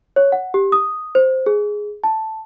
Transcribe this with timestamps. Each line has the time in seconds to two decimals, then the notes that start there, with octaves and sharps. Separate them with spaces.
0.16 C#5
0.32 F#5
0.54 G4
0.72 D#6
1.15 C5
1.46 G#4
2.04 A5